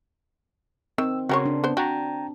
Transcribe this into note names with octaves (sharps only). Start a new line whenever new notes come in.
D#3 C4 E6
C#3 F#4 G4 A#4 C#5 C6
D4
B3 C5
F#4 G5 A#5